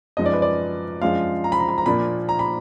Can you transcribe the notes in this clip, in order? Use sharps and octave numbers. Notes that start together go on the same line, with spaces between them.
F#2 F3 G#3 D#4 D#5
D5
B4
D5
F#2 F3 G#3 D4 F5
A#5
B5
A#5
B5
A#5
A#2 F3 A#3 D4 B5
A#5
B5